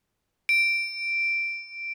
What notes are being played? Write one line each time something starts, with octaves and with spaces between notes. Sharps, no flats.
D7